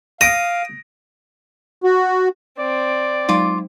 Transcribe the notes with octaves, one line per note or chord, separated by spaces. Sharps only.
F5 D#6 A#6 D7
F#4
C4 D5
F#3 G#3 D#4 F4 D6